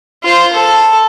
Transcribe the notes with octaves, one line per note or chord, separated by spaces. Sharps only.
F4 C5
A4